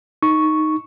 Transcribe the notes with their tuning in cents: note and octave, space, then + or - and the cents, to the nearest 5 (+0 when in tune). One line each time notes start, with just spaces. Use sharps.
D#4 +0 C#6 +0